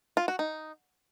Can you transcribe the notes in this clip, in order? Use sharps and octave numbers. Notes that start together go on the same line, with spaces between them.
F4
F#4
D#4